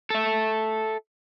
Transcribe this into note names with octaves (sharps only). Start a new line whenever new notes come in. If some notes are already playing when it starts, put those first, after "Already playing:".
A4 E5